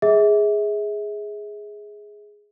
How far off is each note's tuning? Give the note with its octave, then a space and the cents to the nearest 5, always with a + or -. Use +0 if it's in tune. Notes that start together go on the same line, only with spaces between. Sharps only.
G#4 +0 E5 -35